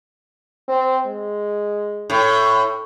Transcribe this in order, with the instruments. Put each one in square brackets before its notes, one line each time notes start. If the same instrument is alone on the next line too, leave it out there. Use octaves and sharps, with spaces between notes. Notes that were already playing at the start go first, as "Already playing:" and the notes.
[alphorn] C4
G#3
[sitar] A2